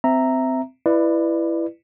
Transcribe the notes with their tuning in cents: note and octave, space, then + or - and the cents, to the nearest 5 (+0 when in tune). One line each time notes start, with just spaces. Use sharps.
C4 -20 E5 +0 A#5 -5
E4 +15 B4 +0 D5 +25